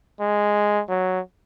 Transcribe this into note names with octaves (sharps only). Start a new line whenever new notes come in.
G#3
F#3